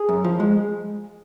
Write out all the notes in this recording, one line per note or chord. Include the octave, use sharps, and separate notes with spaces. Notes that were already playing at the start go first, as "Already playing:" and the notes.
Already playing: G#4
F#2
F3
G#3